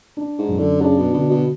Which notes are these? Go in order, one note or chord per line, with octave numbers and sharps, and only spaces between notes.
D4
G#2
F#2
D3
C#3 D4
B2
B2 D3
B2